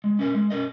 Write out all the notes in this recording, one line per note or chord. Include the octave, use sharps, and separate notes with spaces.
G#3
C#4 A#4 D#5
G#3
C#4 A#4 D#5